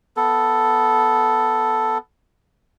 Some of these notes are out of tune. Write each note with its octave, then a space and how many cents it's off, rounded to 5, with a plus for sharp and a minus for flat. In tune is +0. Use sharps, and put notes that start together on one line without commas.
B3 +0 A4 +0